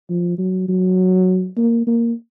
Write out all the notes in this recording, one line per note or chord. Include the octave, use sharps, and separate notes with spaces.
F3
F#3
F#3
A#3
A#3